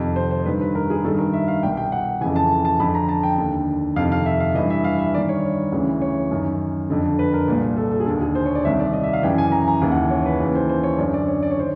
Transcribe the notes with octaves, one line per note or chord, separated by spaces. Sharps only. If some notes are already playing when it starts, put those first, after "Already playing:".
Already playing: F2 C3 D#3
C5
C5
G2 D#3 B4
B4
A#4
G#4
G2 D#3 A4
A#4
E5
F5
C2 B2 G5
G5
F#5
F2 C#3 E3 G#5
A5
A5
F2 D3 B5
A#5
A5
G5
D#2 D3
F2 C3 D#3 F5
F5
E5
F5
G2 E3 D#5
E5
F5
E5
G2 D#3 D5
C#5
D2 C#3 E3
C#5
F#2 D#3
F2 D3
B4
A#4
C2 A#2
A4
A4
G#4
D#2 D3 A4
G#4
C5
C#5
D5
C2 C3 D#3 E5
D5
D#5
E5
F5
F#2 C#3 E3 G5
G#5
A#5
A#5
D#2 C#3 E3 G#5
F#5
C#5
B4
D#2 C#3 E3 B4
C5
C5
C#5
F#2 D3 D5
D5
C#5
D5
C#5
D#3 C5